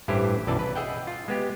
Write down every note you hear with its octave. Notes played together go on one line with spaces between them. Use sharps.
A1 G2 E3 E4 G4 C5
B1 F#2 E3 D5 A5
B4
G#4 D#5 E5 F#5 G5
F4
G#3 B3 G4